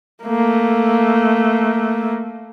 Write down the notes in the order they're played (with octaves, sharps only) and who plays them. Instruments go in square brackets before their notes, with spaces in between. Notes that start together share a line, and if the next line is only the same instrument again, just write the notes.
[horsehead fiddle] A3 A#3